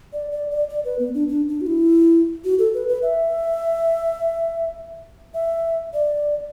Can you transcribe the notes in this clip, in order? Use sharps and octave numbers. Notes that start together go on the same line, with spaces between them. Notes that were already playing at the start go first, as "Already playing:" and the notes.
D5
D5
D5
D5
B4
B3
D4
D4
D4
F#4
E4
F#4
A4
B4
B4
E5
E5
D5